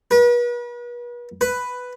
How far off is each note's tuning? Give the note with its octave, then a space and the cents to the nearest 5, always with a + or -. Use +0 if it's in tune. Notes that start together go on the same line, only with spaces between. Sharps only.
B4 -40
B4 +5